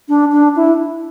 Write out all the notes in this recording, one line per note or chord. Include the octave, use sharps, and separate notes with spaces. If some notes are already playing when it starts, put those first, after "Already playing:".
D4
D4
E4